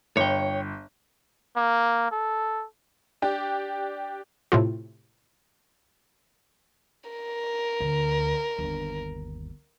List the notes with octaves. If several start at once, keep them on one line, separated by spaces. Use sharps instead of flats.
G1 C#5 G5
A#3
A4
D4 G4
A2 C3 F4
A#4
D2
G1 D#2